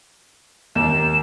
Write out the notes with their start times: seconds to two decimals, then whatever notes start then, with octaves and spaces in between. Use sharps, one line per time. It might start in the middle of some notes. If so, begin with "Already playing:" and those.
0.75 D#2 E7